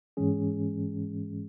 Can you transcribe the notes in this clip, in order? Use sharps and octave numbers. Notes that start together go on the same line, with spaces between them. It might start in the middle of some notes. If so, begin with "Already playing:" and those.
G#2 E3 G#3 C#4 G#4